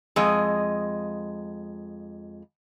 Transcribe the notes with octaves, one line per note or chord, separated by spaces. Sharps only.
F2 G#3 D#5